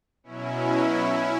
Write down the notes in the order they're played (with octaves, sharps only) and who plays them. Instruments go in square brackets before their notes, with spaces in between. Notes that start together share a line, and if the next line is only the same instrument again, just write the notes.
[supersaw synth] B2 F#3 C#4 E4